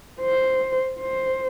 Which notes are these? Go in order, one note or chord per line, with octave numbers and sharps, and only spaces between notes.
C5
C5